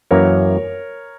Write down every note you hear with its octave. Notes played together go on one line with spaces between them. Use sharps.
F#2 E3 A#3 C#4 A#4 C#5